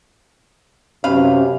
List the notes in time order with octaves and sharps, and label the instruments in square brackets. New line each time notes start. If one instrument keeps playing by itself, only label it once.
[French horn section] F#2 C3 C#4 [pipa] B4 F5